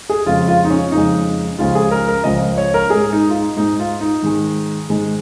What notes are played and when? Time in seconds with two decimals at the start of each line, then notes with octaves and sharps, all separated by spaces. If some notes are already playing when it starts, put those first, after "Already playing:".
0.10 G#4
0.26 F2 C#3 G#3 F4
0.48 F4
0.64 D#4
0.70 C#4
0.92 F2 C#3 G#3 D#4
1.58 C#2 C#3 F3 G#3 F4
1.75 G#4
1.91 A#4
2.08 A#4
2.24 C#2 C#3 F3 G#3 D#5
2.58 C#5
2.74 A#4
2.90 G#2 G#3 G#4
3.13 D#4
3.29 F4
3.34 D#4
3.56 G#2 G#3 D#4
3.79 F4
4.01 D#4
4.22 G#2 D#3 G#3
4.89 G#2 D#3 G#3